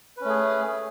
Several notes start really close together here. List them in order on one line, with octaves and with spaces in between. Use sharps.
B4 C#4 A3 G#4